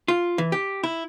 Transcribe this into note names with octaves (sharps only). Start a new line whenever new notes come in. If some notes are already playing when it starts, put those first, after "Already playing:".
F4
E3
G4
E4